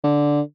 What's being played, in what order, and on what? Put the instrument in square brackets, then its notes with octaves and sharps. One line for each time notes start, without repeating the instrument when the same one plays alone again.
[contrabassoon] D3